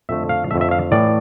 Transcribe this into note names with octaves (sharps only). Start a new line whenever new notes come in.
F2 D3 A3 E5
F5
F2 D3 A3 E5
E5
F5
A2 E3 A3 D5